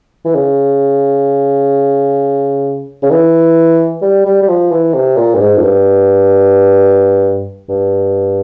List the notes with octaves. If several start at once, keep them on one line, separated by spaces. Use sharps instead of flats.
E3
C#3
C#3
E3
G3
G3
G3
F3
E3
C3
A#2
G2
G#2
F2
G2
G2